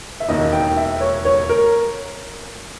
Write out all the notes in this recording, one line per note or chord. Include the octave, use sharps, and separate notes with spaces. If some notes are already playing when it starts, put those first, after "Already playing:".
E5
E1 D#2 D#3 D#5
G5
E5
C#5
C#5
A#4